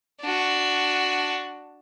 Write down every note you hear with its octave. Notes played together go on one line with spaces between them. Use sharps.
D4 F#4